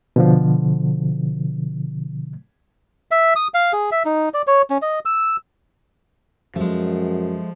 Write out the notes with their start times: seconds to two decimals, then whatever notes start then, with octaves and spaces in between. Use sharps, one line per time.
0.16 B2 D3 F3
3.11 E5
3.36 D#6
3.54 F5
3.73 G#4
3.91 E5
4.05 D#4
4.34 D5
4.47 C#5
4.70 C#4
4.82 D#5
5.06 E6
6.56 F#2 F3 G#3 A3